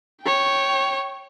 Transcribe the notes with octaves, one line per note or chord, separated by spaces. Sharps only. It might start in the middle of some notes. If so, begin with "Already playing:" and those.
C#5 G5